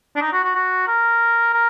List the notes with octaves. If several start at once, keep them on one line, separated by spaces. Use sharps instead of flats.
D4
D#4
F#4
F#4
F#4
A#4
A#4